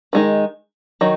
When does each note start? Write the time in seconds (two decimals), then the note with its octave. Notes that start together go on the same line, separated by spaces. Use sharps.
0.13 D#3 G#3 D#4
1.01 D#3 F#3 D#4